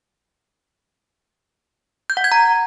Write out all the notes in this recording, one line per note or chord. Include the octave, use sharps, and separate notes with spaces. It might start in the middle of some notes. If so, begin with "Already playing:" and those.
G6
F#5
G#6
A#5